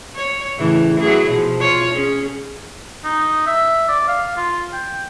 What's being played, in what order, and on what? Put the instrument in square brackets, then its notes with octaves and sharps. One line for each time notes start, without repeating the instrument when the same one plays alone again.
[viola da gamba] C#5
A2 C#3 E3
F#3 E4 G#4
B2 F3
F4 C#5
C#4 G#4
[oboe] D#4
E5
D5
F5
F4
G5